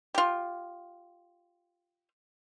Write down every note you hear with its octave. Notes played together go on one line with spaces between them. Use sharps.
F4 G4